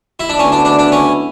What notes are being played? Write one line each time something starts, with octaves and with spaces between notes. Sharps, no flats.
E4
D4
D2 D3 G#3 B3 C#4 E4
D4
D4
D4
C#4